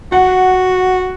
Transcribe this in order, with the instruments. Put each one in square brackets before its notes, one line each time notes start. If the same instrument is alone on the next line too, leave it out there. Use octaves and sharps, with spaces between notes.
[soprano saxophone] F#4 [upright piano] F#5